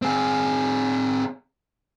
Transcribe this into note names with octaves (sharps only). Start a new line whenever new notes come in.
C4 G#4